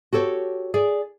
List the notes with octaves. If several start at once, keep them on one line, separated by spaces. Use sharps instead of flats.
F#4 G4 A4 C#5
G#4 D5